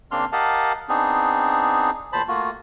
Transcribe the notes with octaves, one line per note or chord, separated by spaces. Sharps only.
C#3 A#3 C4 D4 C6 F6
G4 A#4 D#5 F5 F#5 A5
B3 C4 D4 D#4 G#4
E2 A#2 C5 A5 B5
A3 A#3 F4 F#4